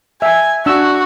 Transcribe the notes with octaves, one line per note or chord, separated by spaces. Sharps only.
E5 G#5
D4 F#4 E6